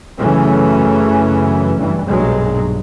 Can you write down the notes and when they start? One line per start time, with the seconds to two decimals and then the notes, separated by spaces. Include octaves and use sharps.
0.19 F#2 C#3 E3 F#3 A3 C#4
1.76 G2 E3
2.07 B1 G2 A#2 F#3 G#3